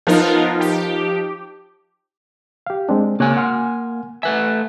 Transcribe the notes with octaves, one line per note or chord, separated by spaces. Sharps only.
F3 B3 D#4 F4 A#4
G4
G4 F5
G#3 C4 D4
C#3 A#3 C#5 G#5 F#6
F#5 C6 F6
A3 B4 E5 F#5 G#5